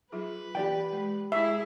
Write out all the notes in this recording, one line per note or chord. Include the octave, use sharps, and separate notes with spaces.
F#3 F4 G#4 B4
E3 G4 D5 G5 B5
G#3
G#3 E4 G#4 E5 C#6